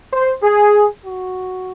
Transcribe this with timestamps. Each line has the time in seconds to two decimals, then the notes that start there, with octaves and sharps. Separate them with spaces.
0.13 C5
0.43 G#4
1.04 F#4